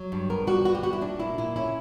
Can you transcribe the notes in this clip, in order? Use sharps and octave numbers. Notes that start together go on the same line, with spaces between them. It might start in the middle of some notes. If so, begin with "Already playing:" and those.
Already playing: F#3
G2
B3 A#4
G3 F#4
B3 F#4
G4
G3 F#4
E4
A#2 D4
A#2 E4
A#2 E4
C#4 E4